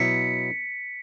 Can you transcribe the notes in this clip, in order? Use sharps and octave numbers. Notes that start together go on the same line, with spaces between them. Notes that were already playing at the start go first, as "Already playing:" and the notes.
Already playing: B2 F#3 B3 E4 B6 C#7